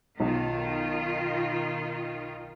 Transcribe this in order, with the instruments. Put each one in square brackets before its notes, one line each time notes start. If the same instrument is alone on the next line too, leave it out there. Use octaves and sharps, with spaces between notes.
[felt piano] B1 [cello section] D#3 F4